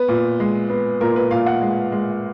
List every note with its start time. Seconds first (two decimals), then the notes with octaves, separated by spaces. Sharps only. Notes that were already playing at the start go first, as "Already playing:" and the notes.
Already playing: B3 B4
0.08 A#2
0.40 G#3
0.70 B3
1.01 A#2 A#4
1.16 B4
1.31 A#2 F5
1.46 F#5
1.62 G#3
1.92 G#3